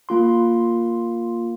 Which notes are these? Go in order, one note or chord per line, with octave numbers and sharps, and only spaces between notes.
A#3 F4 C6